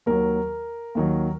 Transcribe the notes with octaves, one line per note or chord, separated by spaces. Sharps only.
D#2 D#3 F#3 A#4
D#2 D#3 F#3